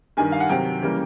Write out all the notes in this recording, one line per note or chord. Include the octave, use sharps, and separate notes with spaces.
G2 D#3 G3 G#5
F5
F#5
C3 D#3 F#3 G5
C#3 E3 G3 A#3